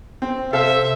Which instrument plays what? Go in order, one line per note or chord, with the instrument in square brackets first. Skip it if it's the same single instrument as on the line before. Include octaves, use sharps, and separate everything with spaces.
[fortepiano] C4
[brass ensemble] C3 [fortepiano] A4 C5 F5 [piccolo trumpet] E5